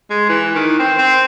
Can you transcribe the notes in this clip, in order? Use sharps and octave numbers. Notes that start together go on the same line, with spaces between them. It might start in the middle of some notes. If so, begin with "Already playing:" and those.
G#3
E3
D#3
C4
C4